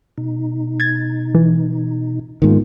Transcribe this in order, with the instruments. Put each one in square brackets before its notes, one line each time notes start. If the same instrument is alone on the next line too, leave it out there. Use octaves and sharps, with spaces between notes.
[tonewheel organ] B2 D#4
[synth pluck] G#6 A6
E3
[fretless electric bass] G#2 D#3 [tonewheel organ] A#3 B3 F4